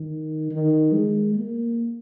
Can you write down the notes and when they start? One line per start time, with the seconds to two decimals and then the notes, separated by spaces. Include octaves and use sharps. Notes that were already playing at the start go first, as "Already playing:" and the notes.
Already playing: D#3
0.51 D#3
0.93 G#3
1.35 A#3